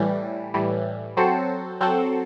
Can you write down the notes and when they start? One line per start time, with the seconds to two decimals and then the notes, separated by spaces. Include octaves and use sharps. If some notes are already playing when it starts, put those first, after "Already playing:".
Already playing: A2 E3 G3
0.54 A2 E3 G3
1.17 F#3 C4 F#4 A4 C5
1.81 F#3 C4 F#4 A4 C5